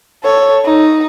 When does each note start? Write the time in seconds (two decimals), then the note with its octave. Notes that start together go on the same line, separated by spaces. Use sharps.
0.23 A4 C#5
0.65 D#4